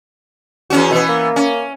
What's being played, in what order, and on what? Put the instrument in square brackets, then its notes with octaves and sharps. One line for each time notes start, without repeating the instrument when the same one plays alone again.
[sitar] E2 C#4 F#4
[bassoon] B2 [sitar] E3 B3
[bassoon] A#3
[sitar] C#4